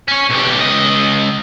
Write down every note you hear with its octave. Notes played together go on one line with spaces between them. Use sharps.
C#4 C#5
B1 G4
C#2 D#5